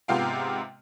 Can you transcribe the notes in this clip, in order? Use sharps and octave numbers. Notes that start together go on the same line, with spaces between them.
G#2 C3 B3 F4 F5 G5